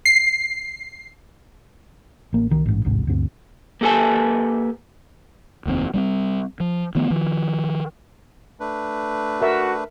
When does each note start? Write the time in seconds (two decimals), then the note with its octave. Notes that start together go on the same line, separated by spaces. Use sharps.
0.05 C7
2.33 A1 A#3
2.50 C2 D#3
2.66 A1 G#2
2.85 A1 D2 G#2 C3
3.07 D2 G2 C4
3.81 A#3 G4 A4 B4 G#5 A5
5.66 F1 D#2 A#2 C4
5.94 G3 B3 C4
6.60 F3
6.95 D#3 F3 A3 B3
7.10 D#3 F3
8.60 A3 D4 B4
9.42 F#4 A#4 E5